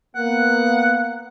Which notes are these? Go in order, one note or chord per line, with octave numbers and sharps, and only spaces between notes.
A#3 B3 F#5